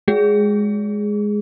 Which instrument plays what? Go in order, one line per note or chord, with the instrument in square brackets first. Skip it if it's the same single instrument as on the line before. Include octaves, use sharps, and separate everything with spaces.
[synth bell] G#3 G#4